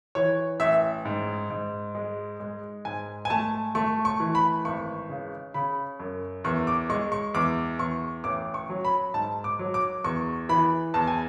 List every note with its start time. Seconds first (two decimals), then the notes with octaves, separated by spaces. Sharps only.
0.15 E3 C#5
0.60 A1 E5
1.05 G#2
1.50 G#2
1.95 G#3
2.40 G#3
2.85 G#2 G#5
3.25 G#5
3.30 A3 A5
3.75 A3 C#6
4.05 C#6
4.20 E3
4.35 B5
4.65 G#1 C#6
5.09 C#3
5.54 C#3 B5
5.99 F#2
6.44 E2 C#6
6.67 D6
6.89 G#3 C#6
7.12 C#6
7.34 E2 D6
7.79 E2 C#6
8.24 A1 D6
8.54 C#6
8.69 F#3
8.85 B5
9.14 G#2 A5
9.44 D6
9.59 F#3
9.74 D6
10.04 E2 C#6
10.49 E3 B5
10.94 E2 A5
11.07 G#5